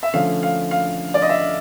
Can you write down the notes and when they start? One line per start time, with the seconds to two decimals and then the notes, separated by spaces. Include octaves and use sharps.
0.03 E5
0.13 D3 F3 A3 C#4 F5
0.43 F5
0.71 F5
1.14 D5
1.22 D#5
1.29 E5